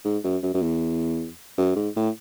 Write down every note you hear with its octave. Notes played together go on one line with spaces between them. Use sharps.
G#2
F#2
F#2
F#2
E2
F#2
G#2
A2